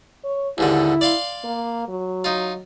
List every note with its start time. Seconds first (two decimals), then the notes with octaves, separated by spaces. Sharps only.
0.24 C#5
0.58 D#2 G#2 D3 E4
1.01 D5 F5 C6
1.44 A#3
1.88 F#3
2.24 D#4 F4